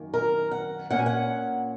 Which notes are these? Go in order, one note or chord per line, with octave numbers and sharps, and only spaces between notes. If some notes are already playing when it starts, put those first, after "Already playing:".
Already playing: F#2 D#3 A#3
A#4
F#5
A#2 A#3 C#4 F#5
G#5
F#5